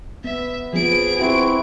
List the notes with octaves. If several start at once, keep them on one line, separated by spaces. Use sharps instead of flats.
B3 E5
F3 B3 G#4 D7
C4 E4 F#4